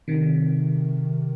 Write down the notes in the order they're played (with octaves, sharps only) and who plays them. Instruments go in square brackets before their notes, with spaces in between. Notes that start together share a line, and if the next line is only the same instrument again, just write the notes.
[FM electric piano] C3 D#3